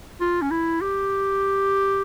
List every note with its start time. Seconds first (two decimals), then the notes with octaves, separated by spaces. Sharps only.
0.21 F4
0.42 C#4
0.51 E4
0.81 G4